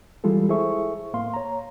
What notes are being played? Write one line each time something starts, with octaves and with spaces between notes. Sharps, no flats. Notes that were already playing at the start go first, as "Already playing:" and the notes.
E3 G3 G#3 F4 A4
E4 G#4 A4 C5 E5 C#6
A2 A#3 F5 C6
C#5 A#5